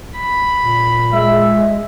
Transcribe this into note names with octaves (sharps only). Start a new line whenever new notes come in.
B5
A#2
G#3 E5